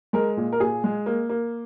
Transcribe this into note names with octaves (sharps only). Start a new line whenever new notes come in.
G#3 A#4
A#2
A#4
A#2 G#4
G#3
A#3
A#3